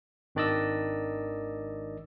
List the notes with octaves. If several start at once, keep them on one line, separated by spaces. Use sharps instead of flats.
G#1 D#3 D4 D5 D#5 E6